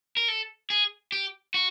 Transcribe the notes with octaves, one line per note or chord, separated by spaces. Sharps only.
A#4
A4
G#4
G4
F#4